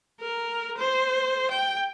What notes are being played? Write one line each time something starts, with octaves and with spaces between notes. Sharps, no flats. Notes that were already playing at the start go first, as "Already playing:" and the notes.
A#4
C5
G5